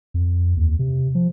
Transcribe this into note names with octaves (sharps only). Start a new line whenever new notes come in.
F2
D#2
C3
F3